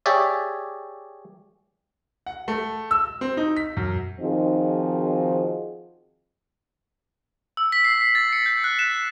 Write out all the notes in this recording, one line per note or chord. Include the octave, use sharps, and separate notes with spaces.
G4 G#4 C#5 D5 E5
F#5
A3
E6
C4
D#4
B6
F#2
D#3 F3 C4 D#4 F#4 G#4
E6
B6
C7
C7
A6
C#7
G6
F#6
E7
B6